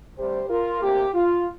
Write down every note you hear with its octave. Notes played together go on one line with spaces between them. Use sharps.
D2 C3 G3 D4 G4 C5
F4 A#4
D2 C3 A#3 G4
F4